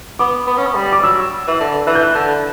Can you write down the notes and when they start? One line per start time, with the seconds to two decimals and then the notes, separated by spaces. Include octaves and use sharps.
0.19 B3 D6
0.47 B3
0.57 C#4
0.66 B3
0.75 G3
0.93 D6
1.03 F#3 E6
1.48 E3
1.60 D3
1.87 E3 F#6
1.95 G6
2.03 F#6
2.15 D3